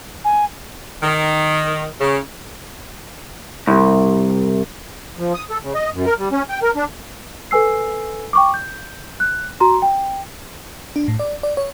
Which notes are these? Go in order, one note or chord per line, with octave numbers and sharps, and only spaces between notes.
G#5
D#3
C#3
C2
F3
D#6
A4
C#3
D#5
F#2
A#4
G3
C#4
G5
A#4
D4
A4 B4 G#5 E6 C7
G5 C#6 D6
G6
F#6
F#4 A#5 C6
G5
D4
A2
D5
D5
C#5